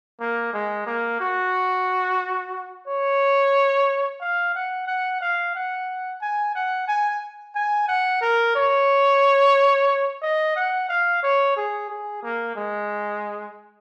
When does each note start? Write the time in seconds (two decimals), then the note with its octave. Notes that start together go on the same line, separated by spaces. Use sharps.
0.20 A#3
0.53 G#3
0.87 A#3
1.20 F#4
2.88 C#5
4.21 F5
4.55 F#5
4.87 F#5
5.21 F5
5.55 F#5
6.21 G#5
6.55 F#5
6.88 G#5
7.55 G#5
7.88 F#5
8.21 A#4
8.56 C#5
10.22 D#5
10.56 F#5
10.89 F5
11.23 C#5
11.57 G#4
11.89 G#4
12.23 A#3
12.56 G#3